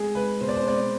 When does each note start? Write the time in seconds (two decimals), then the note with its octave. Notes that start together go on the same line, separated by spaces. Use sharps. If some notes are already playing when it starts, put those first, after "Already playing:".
Already playing: G#3 G#4
0.15 G#3 B4
0.41 B2 C5
0.48 D5
0.56 C5
0.66 G#3 D5